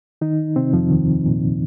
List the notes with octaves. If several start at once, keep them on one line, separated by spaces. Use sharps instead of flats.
D#3 D#4
C3 C4
F2 F3
D#2 D#3
A#2